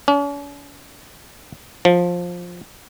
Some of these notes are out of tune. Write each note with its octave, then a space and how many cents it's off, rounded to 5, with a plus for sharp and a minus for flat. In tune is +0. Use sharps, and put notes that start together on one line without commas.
C#4 +45
F3 +15